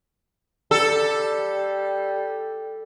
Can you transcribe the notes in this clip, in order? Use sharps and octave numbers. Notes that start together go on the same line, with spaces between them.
G3 A4